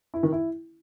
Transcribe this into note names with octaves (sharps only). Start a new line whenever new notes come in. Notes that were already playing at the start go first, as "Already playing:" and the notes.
E4
D#3
E4